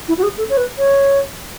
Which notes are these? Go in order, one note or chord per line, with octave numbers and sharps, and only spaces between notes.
E4
F#4
G#4
A4
C#5
B4
C#5